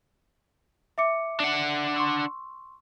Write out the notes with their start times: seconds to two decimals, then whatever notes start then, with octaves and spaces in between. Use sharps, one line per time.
0.98 E5 D6 C#7
1.40 D4 F#5
1.96 C6 C#6 E6